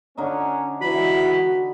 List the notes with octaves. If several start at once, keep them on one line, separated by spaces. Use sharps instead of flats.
D3 C#4 D#4
C#2 E3 F#4 B5